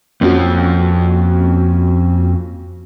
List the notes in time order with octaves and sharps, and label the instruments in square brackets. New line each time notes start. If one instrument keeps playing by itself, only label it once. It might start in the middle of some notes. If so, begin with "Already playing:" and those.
[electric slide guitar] F2 F3 [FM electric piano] A#3 C#4 F#4